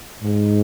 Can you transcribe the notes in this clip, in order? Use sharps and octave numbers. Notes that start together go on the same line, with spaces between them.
G#2